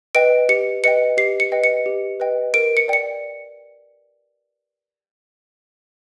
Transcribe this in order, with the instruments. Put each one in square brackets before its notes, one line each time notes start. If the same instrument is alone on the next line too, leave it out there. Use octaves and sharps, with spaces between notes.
[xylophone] B4 D#5 G5 D7
G4 C#7
B4 D#5 G5 C#7
G4 C7
C#7
B4 D#5 G5
C#7
G4
B4 D#5 G5
A#4 D7
C#7
D5 G5 C#7